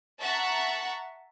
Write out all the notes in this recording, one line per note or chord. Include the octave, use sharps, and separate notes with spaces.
E5 F#5 A5 A#5 C#6 F#6